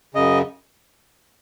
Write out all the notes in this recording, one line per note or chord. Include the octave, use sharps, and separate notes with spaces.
F#2 C#3 D#5